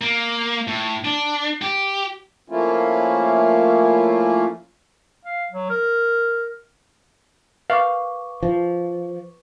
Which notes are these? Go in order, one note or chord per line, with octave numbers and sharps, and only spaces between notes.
A#3
A2
D4
G4
F3 A3 A#3 C#4 E4 F4
F5
F#3
A#4
B4 F5 C#6 D6
F3